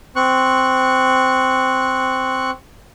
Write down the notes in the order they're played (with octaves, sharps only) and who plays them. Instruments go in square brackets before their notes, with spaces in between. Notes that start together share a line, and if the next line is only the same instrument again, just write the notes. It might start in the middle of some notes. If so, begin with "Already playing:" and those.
[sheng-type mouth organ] C4 C#6 F#6